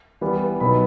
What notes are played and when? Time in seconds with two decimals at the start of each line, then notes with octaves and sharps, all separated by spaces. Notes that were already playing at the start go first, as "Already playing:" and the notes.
0.21 E3 G3 B3
0.60 B2 F#3 B3 D#4 B5